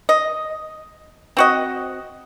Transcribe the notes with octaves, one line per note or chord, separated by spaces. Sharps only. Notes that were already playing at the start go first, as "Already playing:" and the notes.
D#5
C4 F#4 D#5